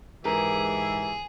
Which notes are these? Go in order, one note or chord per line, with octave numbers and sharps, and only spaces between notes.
G#2 E3 G4 G#4 A#4